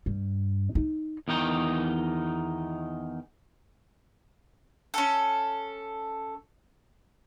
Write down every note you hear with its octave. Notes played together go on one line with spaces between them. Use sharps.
G2
D#4
E2 D#3 D#4 G5
C#4 A4